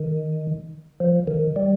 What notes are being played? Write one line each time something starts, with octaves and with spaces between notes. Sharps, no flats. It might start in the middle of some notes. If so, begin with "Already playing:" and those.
Already playing: D#3
F3
D#3
G3